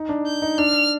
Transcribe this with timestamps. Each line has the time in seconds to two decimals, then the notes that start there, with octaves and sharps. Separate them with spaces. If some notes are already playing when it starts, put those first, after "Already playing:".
Already playing: D#4
0.09 D4
0.26 G6
0.42 D#4
0.58 D4 F6